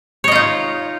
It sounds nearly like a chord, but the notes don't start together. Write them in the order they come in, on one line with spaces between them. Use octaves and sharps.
C#5 D#5 F4 D#4